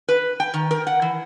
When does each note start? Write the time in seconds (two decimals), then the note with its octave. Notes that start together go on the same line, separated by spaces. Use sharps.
0.08 B4
0.40 G5
0.54 D#3
0.71 A#4
0.87 F#5
1.02 E3